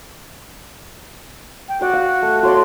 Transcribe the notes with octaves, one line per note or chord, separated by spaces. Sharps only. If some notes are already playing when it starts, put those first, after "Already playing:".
G5
F#4 D5 C6
F5
A3
F#4 C#5 D5 C6